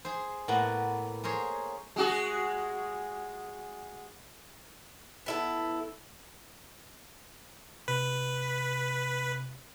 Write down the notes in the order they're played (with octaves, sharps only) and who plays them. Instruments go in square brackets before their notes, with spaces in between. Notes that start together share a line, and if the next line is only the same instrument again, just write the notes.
[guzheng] G#4 C5
A2 A#3 B3 F#5
G#4 A#4 C5 C#5
[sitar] G#3 F#4 G#4
[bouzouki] B3 E4 A4
[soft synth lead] C3 [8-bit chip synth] B4